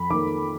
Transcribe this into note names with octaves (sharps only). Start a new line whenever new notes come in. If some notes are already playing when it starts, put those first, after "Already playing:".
Already playing: F2 B5
D#3 A#3 D6